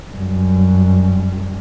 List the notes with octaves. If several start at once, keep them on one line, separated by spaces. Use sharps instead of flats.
F#2 G3